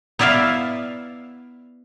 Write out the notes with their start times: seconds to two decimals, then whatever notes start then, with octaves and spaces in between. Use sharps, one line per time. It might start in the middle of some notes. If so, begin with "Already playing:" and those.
0.19 B3 E4 D5 E5 F5